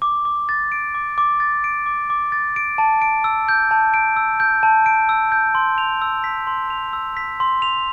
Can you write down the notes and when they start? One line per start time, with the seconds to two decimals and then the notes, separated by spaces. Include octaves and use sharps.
0.02 D6
0.25 D6
0.49 A6
0.72 D7
0.95 D6
1.18 D6
1.40 A6
1.64 D7
1.86 D6
2.10 D6
2.32 A6
2.56 D7
2.78 A5
3.02 D7
3.24 E6
3.49 G6
3.71 A5
3.94 D7
4.16 E6
4.40 G6
4.63 A5
4.86 D7
5.09 E6
5.32 G6
5.55 C6
5.78 F7
6.02 E6
6.24 B6
6.47 C6
6.70 F7
6.93 E6
7.17 B6
7.40 C6
7.62 F7